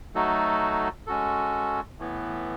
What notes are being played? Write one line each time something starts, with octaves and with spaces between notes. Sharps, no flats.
F#3 A3 D#4 F#4 A4
G#3 C#4 F#4 A4
A2 E3 B3